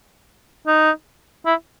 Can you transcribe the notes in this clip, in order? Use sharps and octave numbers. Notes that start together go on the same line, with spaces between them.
D#4
E4